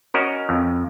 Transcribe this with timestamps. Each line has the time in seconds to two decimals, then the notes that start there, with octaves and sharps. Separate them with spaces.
0.14 C#4 F#4 A#4 D#5
0.49 F2